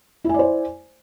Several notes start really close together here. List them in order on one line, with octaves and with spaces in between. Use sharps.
E4 G#5 D5 C5